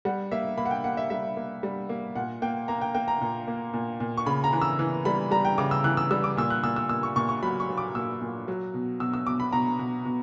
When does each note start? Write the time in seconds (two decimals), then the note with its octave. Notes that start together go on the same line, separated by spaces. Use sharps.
0.05 G3 F#5
0.31 A#3 E5
0.58 A#3 B5
0.65 F#5
0.71 G5
0.84 A#3 F#5
0.97 E5
1.10 G3 E5
1.36 A#3
1.63 G3
1.89 A#3
2.15 A#2 F#5
2.42 A#3 G5
2.68 A#3 A#5
2.81 G5
2.95 A#3 G5
3.08 A#5
3.21 A#2
3.48 A#3
3.73 A#2
4.00 A#2
4.17 C#6
4.26 C#3 B5
4.44 A#5
4.53 E3
4.62 E6
4.79 E3
5.05 G3 B5
5.31 G3 A#5
5.45 G5
5.58 C#3 D6
5.71 E6
5.84 E3 F#6
5.97 E6
6.11 G3 E6
6.24 D6
6.37 A#2 E6
6.50 F#6
6.63 A#2 E6
6.76 E6
6.89 A#2 E6
7.03 C#6
7.16 A#2 C#6
7.29 C#6
7.43 F#3 B5
7.60 C#6
7.69 F#3
7.78 D6
7.95 A#2 E6
8.21 A#2
8.48 F#3
8.74 B2
9.00 B2 E6
9.13 E6
9.27 B2 D6
9.40 B5
9.52 B2 A#5
9.79 B2
10.05 B2